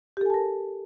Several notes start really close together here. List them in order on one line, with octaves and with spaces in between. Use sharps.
G4 A4 G#5 A5 A#4